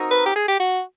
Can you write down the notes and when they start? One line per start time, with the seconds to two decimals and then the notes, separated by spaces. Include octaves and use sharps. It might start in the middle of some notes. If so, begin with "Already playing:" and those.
Already playing: C4 D#4 F#4 A#4
0.11 B4
0.26 G4
0.36 G#4
0.48 G4
0.60 F#4